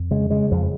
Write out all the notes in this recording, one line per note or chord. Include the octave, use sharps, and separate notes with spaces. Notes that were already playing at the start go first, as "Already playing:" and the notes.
Already playing: F2
C#3 G#3
C#3 G#3
F2 F3